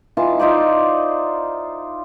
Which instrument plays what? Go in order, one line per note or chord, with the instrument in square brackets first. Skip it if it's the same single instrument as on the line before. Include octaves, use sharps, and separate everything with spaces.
[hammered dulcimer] E3 D#4 F4 A5
D#4 F4 C5 D5